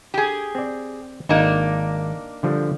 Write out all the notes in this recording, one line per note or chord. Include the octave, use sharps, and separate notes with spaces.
G4 G#4
C4 D5
G#1 A#3 D4 D#4
D3 F3 G3